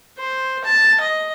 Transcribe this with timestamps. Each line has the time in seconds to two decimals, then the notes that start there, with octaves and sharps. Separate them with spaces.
0.18 C5
0.65 A5
1.00 D#5